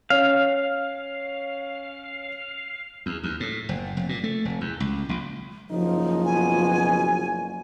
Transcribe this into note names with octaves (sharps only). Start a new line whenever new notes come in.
C#4 F5
E2
D#2
A2
F#1
F1
A#2
A3
F1
E2
C#2
A#1
F#1 F3 D#4
B2 G#5